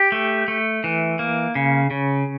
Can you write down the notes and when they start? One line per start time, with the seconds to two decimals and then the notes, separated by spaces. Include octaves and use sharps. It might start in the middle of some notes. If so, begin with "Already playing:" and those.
Already playing: G4
0.12 A3
0.48 A3
0.84 E3
1.19 A#3
1.55 C#3
1.91 C#3